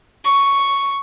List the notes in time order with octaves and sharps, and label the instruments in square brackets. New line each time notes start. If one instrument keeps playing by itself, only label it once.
[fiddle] C#6